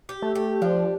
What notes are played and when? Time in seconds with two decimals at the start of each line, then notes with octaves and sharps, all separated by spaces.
0.09 G4
0.22 A3
0.35 G4
0.62 F3 D4